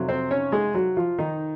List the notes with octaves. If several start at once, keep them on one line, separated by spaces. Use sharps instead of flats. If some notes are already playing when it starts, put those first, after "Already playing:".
Already playing: F2 C3 F#3
C4 C5
C#4 C#5
G#3 G#4
F#3 F#4
F3 F4
D#3 D#4